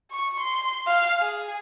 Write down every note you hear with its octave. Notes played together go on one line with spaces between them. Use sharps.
C#6
C6
F5
G#4